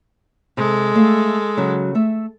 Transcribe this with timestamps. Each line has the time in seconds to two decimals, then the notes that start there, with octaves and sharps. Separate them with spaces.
0.57 C3 G#3 A4
0.95 A3 F5
1.57 C#3 F#3 F#4
1.95 A3 E5